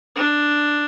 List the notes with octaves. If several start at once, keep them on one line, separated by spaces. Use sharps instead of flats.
D4